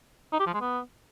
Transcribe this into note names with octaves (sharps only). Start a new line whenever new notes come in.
D#4
G4
F3
G#3
B3